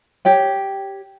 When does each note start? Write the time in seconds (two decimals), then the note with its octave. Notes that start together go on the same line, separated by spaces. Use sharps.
0.25 G4 C#5 G5